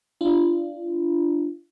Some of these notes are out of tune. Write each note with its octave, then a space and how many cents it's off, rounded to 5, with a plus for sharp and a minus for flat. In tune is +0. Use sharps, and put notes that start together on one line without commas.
D4 +0 F4 -30